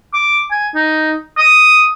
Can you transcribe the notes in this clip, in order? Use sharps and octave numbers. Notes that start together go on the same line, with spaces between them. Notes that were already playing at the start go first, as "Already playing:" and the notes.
D6
G#5
D#4
D#6